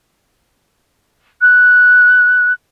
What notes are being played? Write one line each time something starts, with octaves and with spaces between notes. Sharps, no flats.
F#6